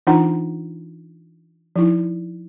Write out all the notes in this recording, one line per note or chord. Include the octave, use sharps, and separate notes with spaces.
E3 D4 D#4 F4 F#5 A#5
F3 D#4 E4